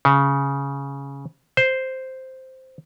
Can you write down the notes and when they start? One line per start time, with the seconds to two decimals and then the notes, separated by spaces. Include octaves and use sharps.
0.05 C#3
1.57 C5